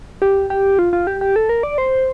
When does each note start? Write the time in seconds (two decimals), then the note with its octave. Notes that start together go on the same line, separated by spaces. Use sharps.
0.22 G4
0.50 G4
0.79 F4
0.93 F4
1.07 G4
1.21 G4
1.36 A4
1.49 A#4
1.63 D5
1.78 C5